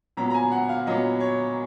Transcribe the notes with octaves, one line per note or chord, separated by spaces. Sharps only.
A#2 F#3 B3 A#5
A#5
G#5
F#5
F5
A#2 F#3 B3 D#5
C#5